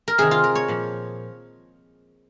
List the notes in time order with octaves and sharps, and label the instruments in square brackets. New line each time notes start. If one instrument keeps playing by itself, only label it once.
[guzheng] A#4
C3 D#3 G#4
F4
A#4
C#5
A#2 F3